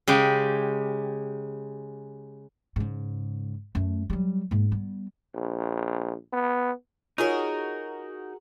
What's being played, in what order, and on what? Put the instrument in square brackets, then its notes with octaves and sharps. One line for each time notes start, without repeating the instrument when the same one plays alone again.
[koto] C#3 G#3 G4
[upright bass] G#2 C#3
F#2 A3
F#3 G3
G#2 A#3
G3 B3
[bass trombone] A#1
B3
[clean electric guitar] D#4 [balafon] F4 C#5 [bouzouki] F#4 G#4 A#4